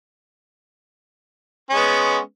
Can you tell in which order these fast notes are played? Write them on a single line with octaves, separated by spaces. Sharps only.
C#4 G#3 B3